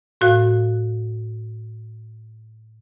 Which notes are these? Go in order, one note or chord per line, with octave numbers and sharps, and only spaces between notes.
A2 F#4 F5 F#6